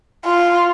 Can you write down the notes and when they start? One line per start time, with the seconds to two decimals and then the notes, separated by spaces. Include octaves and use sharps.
0.25 F4